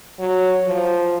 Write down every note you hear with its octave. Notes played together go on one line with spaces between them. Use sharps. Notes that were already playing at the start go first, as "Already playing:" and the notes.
F#3
F3